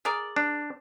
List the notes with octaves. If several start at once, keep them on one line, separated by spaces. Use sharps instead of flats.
G#4 A#4 D5
D4